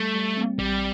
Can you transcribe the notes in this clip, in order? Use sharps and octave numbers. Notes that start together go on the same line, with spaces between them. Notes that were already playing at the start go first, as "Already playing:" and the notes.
Already playing: G3 A3
G3
C4
A1 G3